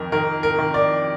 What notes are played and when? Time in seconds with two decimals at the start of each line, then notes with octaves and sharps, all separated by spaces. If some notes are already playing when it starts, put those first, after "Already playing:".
Already playing: F2 D#3 A#4
0.12 D#3 A#4
0.43 A#4
0.59 D#3
0.74 D5